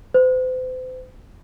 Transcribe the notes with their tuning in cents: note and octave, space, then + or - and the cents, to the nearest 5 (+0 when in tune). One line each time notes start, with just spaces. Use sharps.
C5 -40